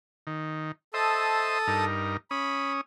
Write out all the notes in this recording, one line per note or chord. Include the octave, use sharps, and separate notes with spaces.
D#3
A4 C5 D#5 E5 A5 D#6
G2 D#4 A#4
C#4 B5 D#6